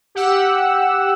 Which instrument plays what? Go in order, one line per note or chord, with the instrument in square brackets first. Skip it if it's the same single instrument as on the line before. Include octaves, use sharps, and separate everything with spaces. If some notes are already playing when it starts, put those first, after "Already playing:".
[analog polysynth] G4 F#5 E6